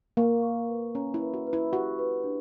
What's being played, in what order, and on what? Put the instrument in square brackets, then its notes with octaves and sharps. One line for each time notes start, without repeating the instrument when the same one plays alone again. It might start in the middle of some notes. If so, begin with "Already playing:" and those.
[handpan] A#3 [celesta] C#6
[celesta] C#6
B4
[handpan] C#4 [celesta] A#5
[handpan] E4
[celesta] B4
[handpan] F#4
[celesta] B4
[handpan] E4
[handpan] F#4 [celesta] G4
[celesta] B4
D4